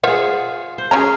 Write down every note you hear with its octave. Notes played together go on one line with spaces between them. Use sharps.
F4 G#4 C5 E5 F#5
C5
C#3 F#3 C#4 G#4 A#5